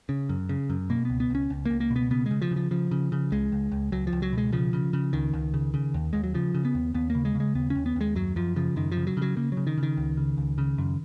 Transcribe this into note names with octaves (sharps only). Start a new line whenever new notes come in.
C#3
F#2
C#3
F#2
B2 A#3
C#2 B3
B3
C#2 C#4
C#2
C#2 A#3
A#3
B2
B3
C#3 B3
G#3
C#3
F3
C#3
F3
C#3 F3
C#3
C#3
C#2 G#3
C#2
C#2
C#2 F#3
F3
C#2
F#3
B2 G#3
C#3 F3
C#3
C#3
C#2 D#3
C#2
C#3
C#3
D#2
D#2 G#3
F#3
C#3 F3
C#3
B3
D#2
D#2 B3
C#3 A#3
G#3
C#3
G#3
D#2 B3
C#4
D#2
B3
D#2 G#3
F#2 F#3
F#2 F3
C#3 F3
F#2 D#3
F3
C#3
F#3
C#3 F#3
C#3 A#3
F#3
C#3
D#3
C#3
D#3
C#2
C#3
C#2
C#3
F#2